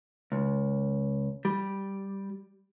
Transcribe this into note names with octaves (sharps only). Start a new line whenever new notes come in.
C#2
G3